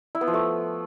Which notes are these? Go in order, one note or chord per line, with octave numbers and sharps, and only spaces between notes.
E4
B3
F3
A3